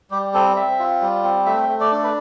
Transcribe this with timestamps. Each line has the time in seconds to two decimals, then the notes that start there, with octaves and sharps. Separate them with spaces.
0.11 G3 G4
0.34 C4 A4
0.56 C4 E5
0.79 F4
1.01 G3
1.24 C4
1.46 A3 E5
1.69 A3
1.81 D5
1.91 D4 A4
2.03 B4